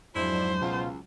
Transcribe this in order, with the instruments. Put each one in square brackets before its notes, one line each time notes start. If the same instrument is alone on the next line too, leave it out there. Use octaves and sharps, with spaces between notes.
[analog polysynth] F2 G#2 D4 [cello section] F#3 [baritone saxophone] E4 [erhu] C5
[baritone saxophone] C#2 [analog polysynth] B2 F4